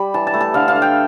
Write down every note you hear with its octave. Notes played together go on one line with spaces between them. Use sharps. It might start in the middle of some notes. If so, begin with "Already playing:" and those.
Already playing: G3 B5
E3 A5
A5
A3
A5
D3 F5
F5
A3
G5